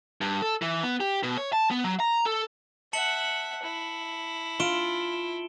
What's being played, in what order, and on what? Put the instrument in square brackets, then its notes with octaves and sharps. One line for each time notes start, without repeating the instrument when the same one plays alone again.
[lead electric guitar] G2
A4
E3
B3
G4
B2
C#5
A5
B3
F#3
A#5
A4
[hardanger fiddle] E5 F#5 [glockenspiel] A5 C#7 F#7
[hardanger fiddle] E4
[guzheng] F4 [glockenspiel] D7 E7 G7